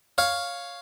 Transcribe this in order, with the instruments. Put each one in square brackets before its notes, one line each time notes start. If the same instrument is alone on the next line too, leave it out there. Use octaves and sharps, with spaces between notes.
[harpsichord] C#5 F5